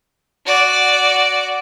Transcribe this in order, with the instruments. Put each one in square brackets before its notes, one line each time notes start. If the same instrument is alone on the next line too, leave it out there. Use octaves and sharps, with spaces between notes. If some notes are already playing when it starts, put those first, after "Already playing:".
[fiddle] F#4 D5